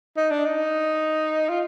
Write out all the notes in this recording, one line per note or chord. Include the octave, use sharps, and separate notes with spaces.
D#4
D4
D#4
F4